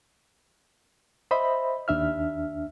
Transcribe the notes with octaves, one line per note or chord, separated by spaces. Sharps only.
C5 D#5 E5 B5
D#2 D4 E5 F6